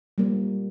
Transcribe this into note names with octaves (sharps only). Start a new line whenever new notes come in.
G3 A#3